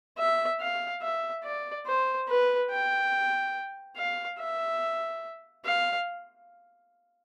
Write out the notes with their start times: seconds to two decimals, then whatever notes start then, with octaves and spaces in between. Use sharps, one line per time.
0.18 E5
0.60 F5
1.02 E5
1.44 D5
1.86 C5
2.28 B4
2.70 G5
3.97 F5
4.39 E5
5.65 F5